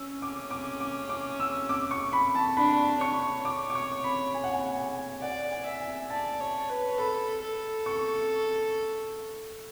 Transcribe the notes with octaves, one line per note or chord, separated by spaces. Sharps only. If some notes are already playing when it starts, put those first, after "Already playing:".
Already playing: C#4 E6
D6
D6
D6
D6
E6
D6
C#6
B5
A5
D4 B5
C#5 C#6
D6
D6
C#6
B5
G#5
F#5
G#5
G#5
D5 F#5
G#5
E5
G#5
D5 A5
C#5
B4
A4 B5
A4
C#6